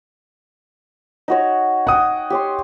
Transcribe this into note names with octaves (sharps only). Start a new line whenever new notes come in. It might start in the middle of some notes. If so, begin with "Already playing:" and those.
D#4 F#4 C#5
F#5 G5 D#6
G4 C#5 C6